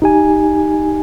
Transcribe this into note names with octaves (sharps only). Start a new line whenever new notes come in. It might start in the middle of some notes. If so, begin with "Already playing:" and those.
D#4 G4 G#5